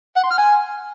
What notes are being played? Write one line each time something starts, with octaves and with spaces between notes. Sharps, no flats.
F#5
C6
F6
G#5